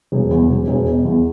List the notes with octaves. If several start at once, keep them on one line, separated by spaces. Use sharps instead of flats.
E1
E2
E1
E1
B2
E2